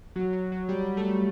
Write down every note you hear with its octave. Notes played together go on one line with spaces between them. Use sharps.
F#3
F#3
F#3
G3
A3